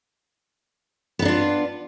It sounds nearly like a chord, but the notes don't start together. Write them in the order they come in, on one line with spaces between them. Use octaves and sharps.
B3 D#4 D4 F4